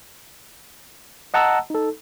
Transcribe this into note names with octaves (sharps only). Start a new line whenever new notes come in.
D#5 F#5 A5 A#5 E6
D#4 A4